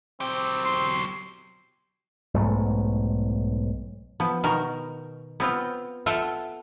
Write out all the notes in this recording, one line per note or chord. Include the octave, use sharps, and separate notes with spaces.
F#3 C4 G4
C6
B1 G#2 A3
F3 B3
B2 D#3 A#4
B3 C4 F4
F4 A4 E5 F#5 G5